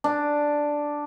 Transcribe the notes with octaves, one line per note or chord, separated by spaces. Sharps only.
D4